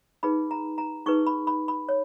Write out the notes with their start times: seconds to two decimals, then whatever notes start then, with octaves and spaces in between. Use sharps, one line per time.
0.23 D#4 G#4 B4 B5
0.51 A#5
0.78 A#5
1.06 D#4 G#4 B4 C#6
1.27 B5
1.47 B5
1.68 B5
1.89 C#5